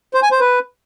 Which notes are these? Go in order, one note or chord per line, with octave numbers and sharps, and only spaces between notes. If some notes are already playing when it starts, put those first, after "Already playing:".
C5
G#5
C5
B4